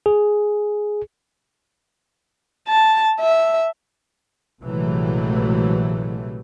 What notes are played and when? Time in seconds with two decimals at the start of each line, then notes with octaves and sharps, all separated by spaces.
0.06 G#4
2.68 A5
3.20 E5
4.63 A#1 C3 E3 F#3 G#3 A3